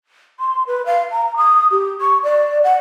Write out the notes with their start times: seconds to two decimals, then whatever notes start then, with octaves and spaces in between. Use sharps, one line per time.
0.40 C6
0.67 B4
0.86 F5
1.12 A#5
1.37 D#6
1.71 G4
2.01 C#6
2.24 D5
2.64 F#5